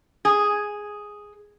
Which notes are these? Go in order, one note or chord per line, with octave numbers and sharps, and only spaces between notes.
G#4